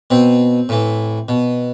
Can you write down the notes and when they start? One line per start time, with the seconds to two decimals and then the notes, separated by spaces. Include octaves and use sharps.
0.11 B2 C4
0.69 A2 E3
1.29 B2